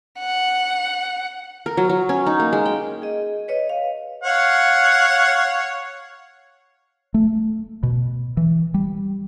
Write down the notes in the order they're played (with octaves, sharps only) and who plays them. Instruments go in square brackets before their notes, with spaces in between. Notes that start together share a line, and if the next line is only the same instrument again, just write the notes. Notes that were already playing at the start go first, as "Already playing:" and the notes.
[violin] F#5
[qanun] A#4
F#3
F#3
C#4
D#4
A#3
G#3
G5
[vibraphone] G#4 D#5
B4 C#5 D#5
F5
[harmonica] C#5 F5 F#5
[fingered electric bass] A3
B2
E3
G3